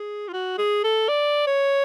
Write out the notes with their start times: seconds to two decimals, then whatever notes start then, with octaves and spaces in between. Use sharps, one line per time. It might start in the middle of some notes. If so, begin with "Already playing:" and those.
Already playing: G#4
0.28 F4
0.33 F#4
0.58 G#4
0.84 A4
1.09 D5
1.47 C#5